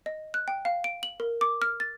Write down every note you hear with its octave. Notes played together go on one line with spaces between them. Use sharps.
D#5
F#6
G5
F5
D7
F#7
A#4
D6
F6
A6